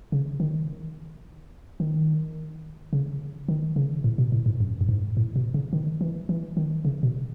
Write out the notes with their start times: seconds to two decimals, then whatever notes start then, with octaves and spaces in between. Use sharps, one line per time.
0.12 C#3
0.40 D#3
1.80 D#3
2.93 C#3
3.49 D#3
3.76 C#3
4.04 A2
4.18 B2
4.32 A2
4.46 G#2
4.60 F#2
4.81 F#2
4.89 G#2
5.17 A2
5.36 B2
5.54 C#3
5.73 D#3
6.01 E3
6.29 E3
6.57 D#3
6.85 C#3
7.03 B2